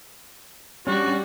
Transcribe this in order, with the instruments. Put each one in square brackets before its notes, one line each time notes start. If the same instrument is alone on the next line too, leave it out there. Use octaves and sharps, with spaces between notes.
[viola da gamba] G3 [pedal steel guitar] C#4 D4 D5 [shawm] F#4